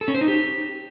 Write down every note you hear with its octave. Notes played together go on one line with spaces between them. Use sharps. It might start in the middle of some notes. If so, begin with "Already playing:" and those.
A4
C#4
C5
D#4
G4